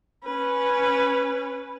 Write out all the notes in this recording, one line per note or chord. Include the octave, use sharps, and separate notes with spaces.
C#4 B4